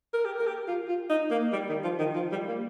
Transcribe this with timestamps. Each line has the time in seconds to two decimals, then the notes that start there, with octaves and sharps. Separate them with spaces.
0.13 A#4
0.25 G4
0.39 A#4
0.47 G4
0.68 F4
0.88 F4
1.09 D#4
1.30 A#3
1.52 G3
1.68 D#3
1.83 F3
1.99 D#3
2.15 F3
2.32 G3
2.48 A#3